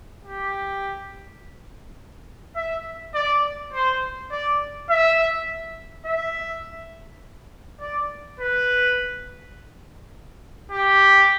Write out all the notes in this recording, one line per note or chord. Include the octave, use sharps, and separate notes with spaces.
G4
E5
D5
C5
D5
E5
E5
D5
B4
G4